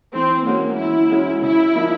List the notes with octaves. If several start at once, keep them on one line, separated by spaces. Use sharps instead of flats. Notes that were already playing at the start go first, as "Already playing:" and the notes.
E3 C4
G#3 A#3 C#4 F#4
E3 E4
G#3 C#4 F#4
C#3 E4
F3 A#3 D#4